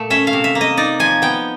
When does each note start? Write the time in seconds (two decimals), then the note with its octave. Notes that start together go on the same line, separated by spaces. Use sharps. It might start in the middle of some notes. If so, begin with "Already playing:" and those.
Already playing: A#2 A3
0.10 C#4 E5
0.27 F5
0.33 C3
0.44 E5
0.55 A#3
0.61 D#5
0.77 D#4 D5
1.00 F3 G#5
1.22 B3 G5